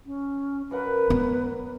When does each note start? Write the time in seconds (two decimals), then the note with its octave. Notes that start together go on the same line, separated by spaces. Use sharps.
0.06 C#4
0.71 F#2 A#4 B4 F#5
1.10 B3